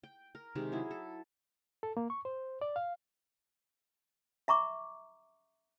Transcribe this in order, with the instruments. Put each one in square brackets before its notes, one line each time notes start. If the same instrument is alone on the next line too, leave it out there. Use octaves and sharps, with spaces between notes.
[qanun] G5
A#4
C3 D#3 G#3 G4
F#3 E4 G#4
A4
[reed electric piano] A4
A#3
C#6
C5
D5
F5
[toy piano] E5 A#5 C#6 D6